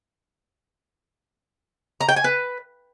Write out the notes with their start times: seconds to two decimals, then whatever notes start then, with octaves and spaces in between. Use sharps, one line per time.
2.01 A#5
2.08 G5
2.16 G#5
2.24 B4